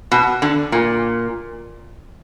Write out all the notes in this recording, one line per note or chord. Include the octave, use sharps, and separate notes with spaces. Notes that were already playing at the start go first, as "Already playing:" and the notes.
B2
D3
A#2